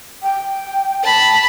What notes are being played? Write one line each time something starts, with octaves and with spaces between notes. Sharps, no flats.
G5
A5 B5